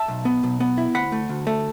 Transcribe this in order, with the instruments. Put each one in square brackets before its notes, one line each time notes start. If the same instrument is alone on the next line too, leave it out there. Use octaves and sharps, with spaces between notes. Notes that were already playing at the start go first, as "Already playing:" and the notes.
Already playing: [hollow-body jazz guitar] E5 A5
B1
B3
B1
B3
E4
D2 F#5 B5
A3
D2
A3